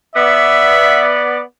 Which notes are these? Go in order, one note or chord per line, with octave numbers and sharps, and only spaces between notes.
B3 D5 E5